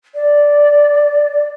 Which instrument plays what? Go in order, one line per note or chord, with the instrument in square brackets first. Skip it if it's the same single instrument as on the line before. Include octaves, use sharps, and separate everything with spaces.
[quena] D5